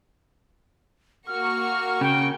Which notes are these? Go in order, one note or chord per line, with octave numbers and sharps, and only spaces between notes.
A#3 F#4 C#6 F6
C#3 G5